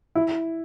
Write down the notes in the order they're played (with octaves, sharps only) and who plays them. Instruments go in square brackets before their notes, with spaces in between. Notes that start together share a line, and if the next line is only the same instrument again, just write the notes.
[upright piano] E4